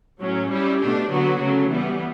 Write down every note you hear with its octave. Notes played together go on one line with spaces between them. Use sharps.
A2 F#3 C#4
G3 C#4 E4
B2 A3 D4 G4
D3 F#3 B3 F#4
C#3 F#3 A3
E3 G3 B3